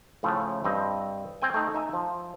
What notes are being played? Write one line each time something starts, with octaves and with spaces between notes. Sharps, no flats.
A2 C#3 F3 A3
G2 C4 D#5
C4 G5 G#5
A3 D#4
D#4 E5 G#5
F3